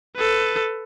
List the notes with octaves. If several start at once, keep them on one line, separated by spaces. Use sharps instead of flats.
A4 B4